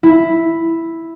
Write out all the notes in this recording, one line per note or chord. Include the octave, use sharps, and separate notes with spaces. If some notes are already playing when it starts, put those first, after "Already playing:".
E4